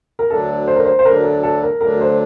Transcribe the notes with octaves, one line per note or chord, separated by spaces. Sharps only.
A#4
D2 D3 F#3 A3 D4 A4
C5
A#4
C5
C5
D2 D3 F#3 A3 D4 A#4
A4
A4
A#4
D2 D3 F#3 A3 D4 A#4
C5